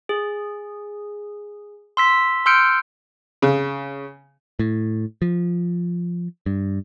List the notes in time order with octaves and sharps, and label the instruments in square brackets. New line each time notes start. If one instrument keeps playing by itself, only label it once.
[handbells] G#4
C6 E6 B6
C6 E6 F6 G6 C#7 D7
[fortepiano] C#3
[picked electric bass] A2
F3
G2